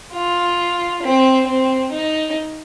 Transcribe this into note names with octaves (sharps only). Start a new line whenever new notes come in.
F4
C4
C4
D#4